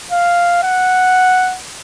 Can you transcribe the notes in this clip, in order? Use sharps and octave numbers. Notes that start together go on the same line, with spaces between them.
F5
F#5